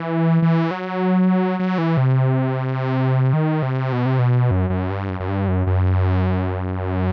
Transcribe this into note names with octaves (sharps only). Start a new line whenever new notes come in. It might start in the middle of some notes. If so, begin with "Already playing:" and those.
Already playing: E3
E3
F#3
F#3
E3
C3
D#3
C3
B2
C3
B2
F#2
F#2
G2
F#2
F#2
G2
F#2
F#2